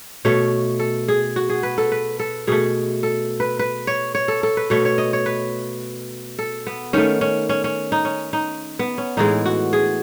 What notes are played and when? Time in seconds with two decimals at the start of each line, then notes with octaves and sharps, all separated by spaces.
0.25 B2 A3 C#5
0.80 A4
1.08 G#4
1.36 F#4
1.50 G#4
1.63 B4
1.78 A4
1.92 B4
2.20 A4
2.47 B2 A3 G#4
3.03 A4
3.40 B4
3.59 B4
3.87 C#5
4.15 C#5
4.28 A4
4.43 A4
4.57 B4
4.70 B2 A3 C#5
4.85 C#5
4.98 D#5
5.13 C#5
5.26 B4
6.39 A4
6.67 B3
6.93 D#3 A3 C#4
7.21 C#4
7.49 C#4
7.64 C#4
7.92 D#4
8.05 C#4
8.33 D#4
8.79 B3
8.98 C#4
9.17 A2 E3 G#3 D#4
9.46 F#4
9.73 G#4